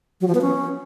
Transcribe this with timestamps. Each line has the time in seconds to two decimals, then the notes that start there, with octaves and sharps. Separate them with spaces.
0.21 F#3
0.28 F3
0.35 B3
0.41 C#4